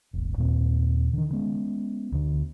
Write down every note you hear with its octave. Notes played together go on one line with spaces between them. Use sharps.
E1 A1
D#2 A#2 C4
D3 D#3
G#3 B3 C#4
D2 D3